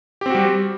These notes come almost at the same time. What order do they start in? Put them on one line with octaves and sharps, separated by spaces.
G4 C4 F#4 G3